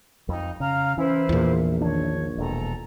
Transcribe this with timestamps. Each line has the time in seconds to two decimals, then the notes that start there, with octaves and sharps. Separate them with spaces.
0.29 F2 D#4
0.60 C#3 F5 A#5 F6
0.97 E3 C#4 E4 B4 C5
1.29 A#1 E2 A#2
1.81 D#3 D4 C#5
2.38 E1 A4 A#5